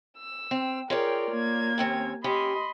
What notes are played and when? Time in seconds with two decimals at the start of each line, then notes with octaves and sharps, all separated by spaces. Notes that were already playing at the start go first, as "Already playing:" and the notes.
0.19 E6
0.51 C4
0.90 F4 G#4 A#4 C#5 D5 G5
1.30 A#3 G#6
1.78 D#2 C4 C#4
2.24 C#4 G4 D#5 B5 C6